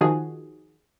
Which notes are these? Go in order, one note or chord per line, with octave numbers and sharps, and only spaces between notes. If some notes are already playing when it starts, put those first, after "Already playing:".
D#3 F3 F#4 G#4